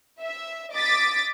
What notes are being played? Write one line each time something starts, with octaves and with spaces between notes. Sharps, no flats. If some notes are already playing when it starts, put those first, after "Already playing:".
E5
D#5 D6 A6 B6